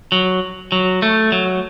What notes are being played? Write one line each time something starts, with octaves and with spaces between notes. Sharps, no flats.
F#3
F#3
A3
F#3